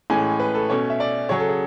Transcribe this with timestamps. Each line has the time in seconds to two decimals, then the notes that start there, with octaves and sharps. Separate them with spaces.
0.10 A2 E3 G#3 C#4 G#5
0.40 B4
0.55 A4
0.70 B2 A3 C#4 C#5
0.90 E5
1.00 D5
1.29 C#3 F#3 C#4 C#5
1.40 A4
1.49 G#4